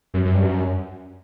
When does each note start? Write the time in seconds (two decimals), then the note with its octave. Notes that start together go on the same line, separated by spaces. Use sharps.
0.14 F#2
0.25 F#2
0.34 G2
0.43 F#2